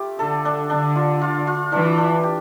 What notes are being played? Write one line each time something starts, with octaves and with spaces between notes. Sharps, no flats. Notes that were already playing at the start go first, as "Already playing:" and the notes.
Already playing: A3 F4 G4
D3 A4
D4
D3 D4
F4
F4
F4
E3 D4
D4
G4